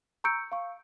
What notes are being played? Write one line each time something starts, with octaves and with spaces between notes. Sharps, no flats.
A#5 C#6 E6 G6 C#7 D7
F5 C#6